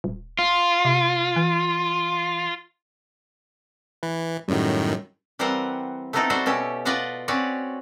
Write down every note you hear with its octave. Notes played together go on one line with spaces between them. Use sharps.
D#1
F4
C3
E3
E3 B4
F#2 A2 D#3 G3 C#4 F#4
E3 G3 C4 A#4 C5 F#5
A3 B3 C4 D#4 E4 A4
G3 C4 F#4 A4 C5 E5
B2 C#4 G4 E5
F4 B4 D5 D#5 F5 F#5
C4 C#4 F#4 B4 C#5 D5